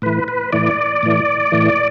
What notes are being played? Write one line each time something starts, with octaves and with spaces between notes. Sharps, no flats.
A2 E3 B4
B4
A2 E3 D5
A2 E3
A2 E3